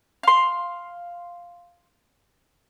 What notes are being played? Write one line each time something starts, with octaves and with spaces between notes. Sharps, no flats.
F5 C6